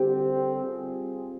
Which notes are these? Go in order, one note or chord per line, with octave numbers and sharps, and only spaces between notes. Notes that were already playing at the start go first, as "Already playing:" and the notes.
Already playing: D3 G3 C4 G4
G3 C4 F4 G#4